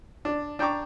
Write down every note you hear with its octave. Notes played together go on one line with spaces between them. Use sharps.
D4
D4 G5 A#5 C#6 D6